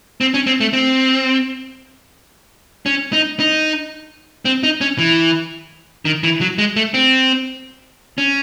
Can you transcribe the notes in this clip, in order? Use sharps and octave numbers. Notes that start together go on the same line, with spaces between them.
C4
C#4
C4
A3
C4
C#4
D#4
D#4
C4
D#4
C#4
E3
D#3
E3
F#3
G#3
A3
C4
C#4